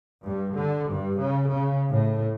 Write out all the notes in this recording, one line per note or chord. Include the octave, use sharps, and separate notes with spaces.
G2
D3
G2
C#3
C#3
A2